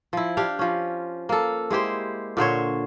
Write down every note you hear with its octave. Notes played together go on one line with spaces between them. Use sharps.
F3 E4
D4 G4 F5
F3 C#4
A#3 A4
G#3 E4 G4 C5
A#2 D3 C5 C#5